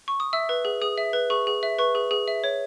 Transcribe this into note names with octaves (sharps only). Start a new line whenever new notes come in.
C#6
D#6
E5 E6
B4
G#4
G#4 D#6
E5
B4
G#4 C#6
G#4
E5
B4 C#6
G#4
G#4
E5
C#5